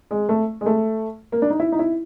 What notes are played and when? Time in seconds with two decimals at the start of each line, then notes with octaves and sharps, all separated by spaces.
0.11 G#3
0.29 A3
0.61 G#3
0.66 A3
1.32 A#3
1.42 D4
1.50 D#4
1.60 E4
1.72 D#4
1.79 E4